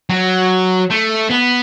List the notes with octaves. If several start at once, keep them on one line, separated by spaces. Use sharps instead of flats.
F#3
A3
B3